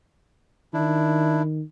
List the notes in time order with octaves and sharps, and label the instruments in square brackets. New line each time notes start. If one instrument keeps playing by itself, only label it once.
[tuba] D#3 [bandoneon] D4 E4